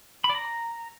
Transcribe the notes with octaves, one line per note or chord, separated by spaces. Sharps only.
B5
D5
A#5